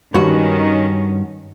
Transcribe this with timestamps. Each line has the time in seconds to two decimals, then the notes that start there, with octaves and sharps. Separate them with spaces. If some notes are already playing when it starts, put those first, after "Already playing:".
0.15 G2 D#3 C#4 F#4